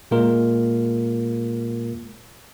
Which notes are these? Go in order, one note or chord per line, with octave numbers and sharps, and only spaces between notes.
A#2 G#3 A#3 F4 A#4